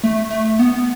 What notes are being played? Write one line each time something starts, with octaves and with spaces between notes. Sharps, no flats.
A3
A3
B3